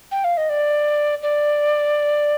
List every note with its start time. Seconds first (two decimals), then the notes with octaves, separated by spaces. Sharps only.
0.12 G5
0.24 F5
0.37 D#5
0.49 D5
1.22 D5